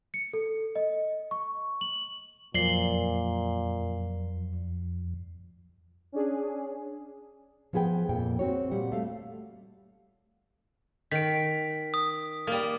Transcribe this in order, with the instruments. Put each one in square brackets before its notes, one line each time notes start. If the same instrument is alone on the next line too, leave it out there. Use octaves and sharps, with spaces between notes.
[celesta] C#7
A4
D#5
C#6
F#7
[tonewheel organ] F2 [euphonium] A#2 [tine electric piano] F3 F#3 D5 [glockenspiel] C7 F#7 G7
[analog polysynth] C#4 D4 G#4
[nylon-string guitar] F3 B3 G#4 B4 G5
F2 A#2 A#3 G5
C4 F#4 C#5
A#2 G3 F#5
A3 F5
[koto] D#3 [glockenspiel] B6 D7
[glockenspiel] D#6
[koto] G3 A#3